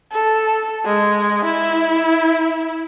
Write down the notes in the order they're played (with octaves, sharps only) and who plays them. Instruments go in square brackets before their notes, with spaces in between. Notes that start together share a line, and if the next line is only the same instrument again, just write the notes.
[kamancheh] A4
G#3
E4